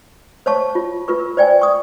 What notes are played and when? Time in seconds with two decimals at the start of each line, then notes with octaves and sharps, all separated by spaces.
0.46 C5 C#5 F5 A5 C#6
0.75 F4
1.08 F4 A#4 B4 C#6
1.37 C5 D5 G5 G#5
1.62 C#6 D#6